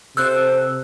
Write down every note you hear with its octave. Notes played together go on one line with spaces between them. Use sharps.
C3 A4 C5 E6 F#6